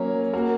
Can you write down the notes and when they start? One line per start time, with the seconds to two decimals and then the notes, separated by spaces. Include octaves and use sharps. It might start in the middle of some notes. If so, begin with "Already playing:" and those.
Already playing: F#3 A#3 C#4 A#4 C#5
0.33 A#3 F#4 A#4